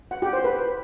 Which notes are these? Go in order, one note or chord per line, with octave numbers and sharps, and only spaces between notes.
F#5
G4
C5
B4